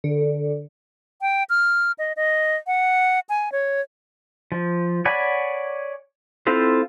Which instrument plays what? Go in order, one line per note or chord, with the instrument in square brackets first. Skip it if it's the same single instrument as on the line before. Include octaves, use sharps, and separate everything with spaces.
[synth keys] D3
[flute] G5
F6
D#5
D#5
F#5
G#5
C#5
[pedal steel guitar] F3
C#5 D5 F#5 G#5 B5
C4 E4 F4 A4 C5